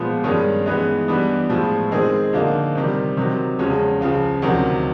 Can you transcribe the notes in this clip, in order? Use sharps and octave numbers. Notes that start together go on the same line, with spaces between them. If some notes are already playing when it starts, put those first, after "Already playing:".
Already playing: A#2 F3 G#3 B3
G2 D#3 G#3 C#4
E3 G#3 B3 D#4
E3 G3 B3 D4
A2 F3 G#3
D#3 G#3 C4 D#4 G#4
D3 F3 A#3 D#4
C3 D#3 G3
C3 D#3 F#3
E2 C#3 F3 G#3 C#4
C#2 C#3 F3
D2 C3 D#3 F#3